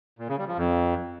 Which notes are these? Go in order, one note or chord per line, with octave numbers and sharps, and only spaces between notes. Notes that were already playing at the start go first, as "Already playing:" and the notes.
A#2
C#3
G3
F3
F2